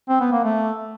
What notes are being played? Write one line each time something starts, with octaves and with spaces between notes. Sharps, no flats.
C4
B3
A#3
A3